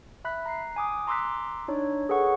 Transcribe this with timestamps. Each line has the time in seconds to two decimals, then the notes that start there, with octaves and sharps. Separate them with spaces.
0.25 E5 B5 F#6 B6
0.46 A#5 F#6 C7
0.76 G#5 D6 D#6
1.07 A#5 C6 D6 E6 F#6 B6
1.68 D4 D#4 C#5
2.09 G#4 A4 B4 C#5 F#5 C#6